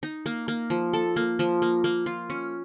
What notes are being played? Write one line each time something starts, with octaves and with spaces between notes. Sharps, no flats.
D#4
A#3
A#3
F3
A4
A#3
F3
A#3
A#3
F4
C#4